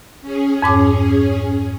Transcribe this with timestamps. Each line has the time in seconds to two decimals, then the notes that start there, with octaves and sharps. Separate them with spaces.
0.22 C#4 G#4
0.62 F2 G#2 D6